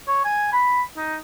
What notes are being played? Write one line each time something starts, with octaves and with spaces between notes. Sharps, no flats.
C#5
G#5
B5
D#4